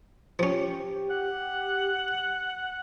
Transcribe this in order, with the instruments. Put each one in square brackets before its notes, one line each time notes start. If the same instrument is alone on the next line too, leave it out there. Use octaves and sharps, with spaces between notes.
[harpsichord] F3 C#4 [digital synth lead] G4
[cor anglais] F#5